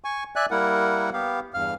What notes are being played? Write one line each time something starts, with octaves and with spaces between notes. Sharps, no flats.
G#5 C#6
D5 E5 G#5 F#6
G3 A#3 E4 A#4 F#5
B3 G4 F5
E2 G2 F5 F6